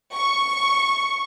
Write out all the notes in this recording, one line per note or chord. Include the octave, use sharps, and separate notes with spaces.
C#6